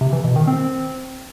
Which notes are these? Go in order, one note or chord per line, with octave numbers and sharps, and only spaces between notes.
C3
E3
B2
D#3
C4